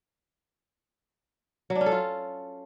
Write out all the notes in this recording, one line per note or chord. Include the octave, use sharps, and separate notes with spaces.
F#3
D4
C#4
A4
F4